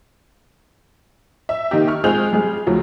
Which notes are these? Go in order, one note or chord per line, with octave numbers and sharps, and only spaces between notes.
E5
D#3 A#3 D#4 G4
C#6 F6
G#3 C4 F4 G#4 G6 F7
G3 G#4
D2 F3 F#3